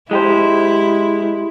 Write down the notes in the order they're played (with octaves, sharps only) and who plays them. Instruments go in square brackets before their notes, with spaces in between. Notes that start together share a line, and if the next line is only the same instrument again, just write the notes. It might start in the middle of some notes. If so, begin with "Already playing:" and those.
[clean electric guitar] G#3 G4 C5 [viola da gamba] E4